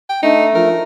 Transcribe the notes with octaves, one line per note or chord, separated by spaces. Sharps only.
G5
A3 D4 D#4
F3 A#4